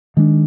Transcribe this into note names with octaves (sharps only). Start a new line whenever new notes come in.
D#3 G#3 D4